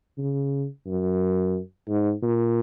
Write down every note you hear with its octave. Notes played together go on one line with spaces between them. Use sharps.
C#3
F#2
G#2
A#2